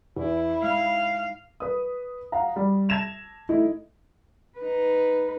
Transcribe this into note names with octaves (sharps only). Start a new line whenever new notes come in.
E2 E4
G#2 F5
B4 D#6
F5 F#5 A#5
G3
A5 G#6 A#6 E7 F7
A3 D#4 E4
D#4 B4